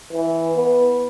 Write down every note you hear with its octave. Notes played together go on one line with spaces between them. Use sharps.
E3
B3